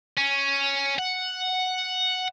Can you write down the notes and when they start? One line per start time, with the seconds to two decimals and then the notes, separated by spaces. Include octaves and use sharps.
0.17 C#4
0.99 F#5